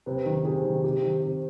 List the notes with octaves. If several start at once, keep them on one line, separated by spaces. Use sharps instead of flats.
C3 B4
D#3
C3 G#4
D#3
C3 G4
D#3
C3